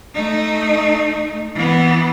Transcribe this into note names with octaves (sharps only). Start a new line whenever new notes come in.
A3 D#4
E3 B3